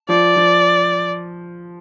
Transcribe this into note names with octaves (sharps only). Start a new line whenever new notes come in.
F3 D5
F3